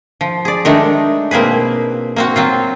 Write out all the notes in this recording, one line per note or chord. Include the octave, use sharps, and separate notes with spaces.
F3
G#4 D5
D#3 G#3 A3 D4 D#4
B2 A#3 C4 G#4 B4
A#3 C4 F#4
F#3 C4 F4